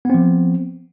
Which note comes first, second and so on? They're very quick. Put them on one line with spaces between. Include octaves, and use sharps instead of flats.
B3 C4 F3